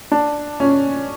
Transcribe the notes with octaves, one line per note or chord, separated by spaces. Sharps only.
D4
C#4